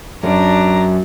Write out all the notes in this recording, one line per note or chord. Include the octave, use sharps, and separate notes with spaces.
F#2 D4 A#5